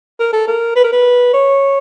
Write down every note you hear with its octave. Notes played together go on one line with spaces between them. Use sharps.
A#4
A4
A#4
B4
A#4
B4
C#5